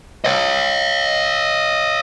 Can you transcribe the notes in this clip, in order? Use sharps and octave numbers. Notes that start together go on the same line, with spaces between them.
C#5 D#5